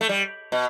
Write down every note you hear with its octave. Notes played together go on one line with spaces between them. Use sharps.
A3
G3
B2